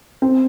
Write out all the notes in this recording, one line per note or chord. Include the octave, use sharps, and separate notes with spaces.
C4